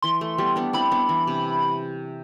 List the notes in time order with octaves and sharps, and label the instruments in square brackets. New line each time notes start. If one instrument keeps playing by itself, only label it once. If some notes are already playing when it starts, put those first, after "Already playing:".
[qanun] E3 [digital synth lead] C6
[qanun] A3
G3 B3
B3 D4
[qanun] C4 E4 [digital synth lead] B5
[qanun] B3 D4
E3
C3